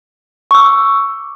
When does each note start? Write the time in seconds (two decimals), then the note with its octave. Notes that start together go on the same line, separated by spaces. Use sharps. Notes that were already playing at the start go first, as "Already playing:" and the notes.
0.51 C#6
0.55 E6
0.58 D6